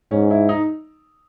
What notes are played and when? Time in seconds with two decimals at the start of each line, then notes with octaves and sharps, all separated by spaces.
0.11 G#2 C#4
0.31 E4
0.49 D#4